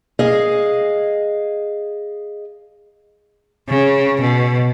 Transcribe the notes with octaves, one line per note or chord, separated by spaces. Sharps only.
G#4 D#5 F5
C#3
B2